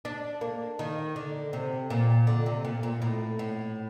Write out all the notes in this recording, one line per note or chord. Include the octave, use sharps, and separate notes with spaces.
D4
A#3
D#3
D3
C3
A#2
D3
C3
A#2
A#2
A2
A2